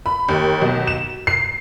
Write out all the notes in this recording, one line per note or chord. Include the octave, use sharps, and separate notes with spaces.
B5
D#2
B1
E7
C7